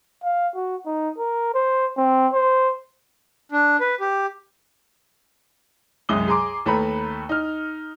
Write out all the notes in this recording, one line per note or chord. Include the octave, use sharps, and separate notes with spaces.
F5
F#4
D#4
A#4
C5
C4
C5
D4
B4
G4
C2 F#2 G#3 D#6 G7
G#4 A#5 C6 D6
D#2 A3 B4 A#5 B5
D#4 F6